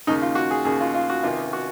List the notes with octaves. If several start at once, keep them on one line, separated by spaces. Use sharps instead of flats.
D#2 C#3 D#4
F4
F#4
G#4
D#2 C#3 G#4
F4
F4
F#4
C#2 C3 D#3 F4
F#4